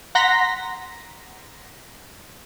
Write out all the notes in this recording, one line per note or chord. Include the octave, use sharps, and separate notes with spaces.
F#5 A#5 C6 A#6 B6